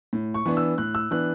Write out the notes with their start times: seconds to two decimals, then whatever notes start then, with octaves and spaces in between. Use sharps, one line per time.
0.13 A2
0.34 C#6
0.46 E3 B3 D4
0.57 E6
0.78 A2 F#6
0.95 E6
1.11 E3 B3 D4 F#6